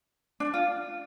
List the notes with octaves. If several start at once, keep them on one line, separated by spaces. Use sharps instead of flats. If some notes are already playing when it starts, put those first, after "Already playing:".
D4
F4